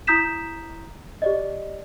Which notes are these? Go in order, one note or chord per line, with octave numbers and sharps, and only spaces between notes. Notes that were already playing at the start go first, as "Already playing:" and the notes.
E4 A#5 D#6 G6 B6 E7
G4 D5 D#5